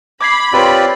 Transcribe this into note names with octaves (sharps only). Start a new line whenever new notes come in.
B5 D6 G#6 C7
C4 F4 G4 B4 C#5 D5